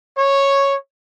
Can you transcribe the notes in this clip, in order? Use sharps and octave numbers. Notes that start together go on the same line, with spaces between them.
C#5